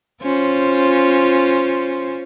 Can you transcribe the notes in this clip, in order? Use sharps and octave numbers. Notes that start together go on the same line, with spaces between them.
C#4 F4 C5